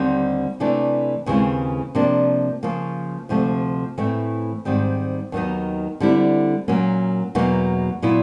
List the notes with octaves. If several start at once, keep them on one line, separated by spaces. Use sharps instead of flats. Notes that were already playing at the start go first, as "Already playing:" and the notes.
Already playing: D#2 D3 G3 C4 D#4
C3 E3 A3 D4
D#2 C#3 E3 G#3 C4
C3 F3 A#3 D4
C#3 F3 A#3
D2 C3 F3 A3
A2 E3 A3 C4
G#2 D#3 G3 C4
D#2 D#3 F#3 B3 D#4
D3 G3 C4 E4
A#2 F#3 A#3 C#4
E2 B2 F#3 A#3 D#4
A#2 F#3 B3 E4